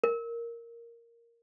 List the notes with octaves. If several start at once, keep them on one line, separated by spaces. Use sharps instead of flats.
A#4